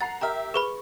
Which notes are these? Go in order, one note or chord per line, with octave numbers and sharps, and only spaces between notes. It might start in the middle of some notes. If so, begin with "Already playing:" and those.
F#5 A#5 A6 C7
G4 A#4 E5 A#5 F6
G#4 B4 B5 C#6